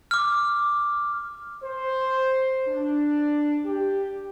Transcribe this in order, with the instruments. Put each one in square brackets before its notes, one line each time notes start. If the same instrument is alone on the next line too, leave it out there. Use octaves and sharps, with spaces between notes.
[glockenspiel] D6 F6
[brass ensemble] C5
D4
G4